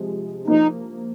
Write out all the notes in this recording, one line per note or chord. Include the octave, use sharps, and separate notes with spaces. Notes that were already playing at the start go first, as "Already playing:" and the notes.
Already playing: C3 F3 G#3
F3 A#3 D#4